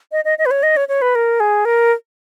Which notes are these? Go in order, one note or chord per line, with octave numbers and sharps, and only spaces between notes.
D#5
D#5
D#5
B4
C#5
D#5
C#5
C#5
B4
A#4
G#4
A#4